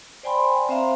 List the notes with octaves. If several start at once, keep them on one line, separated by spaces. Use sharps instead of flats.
C5 D5 G5 G#5 B5 C6
C4 C5 E5 F5 A#5